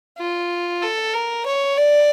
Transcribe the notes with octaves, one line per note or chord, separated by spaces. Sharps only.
F4
A4
A#4
C#5
D5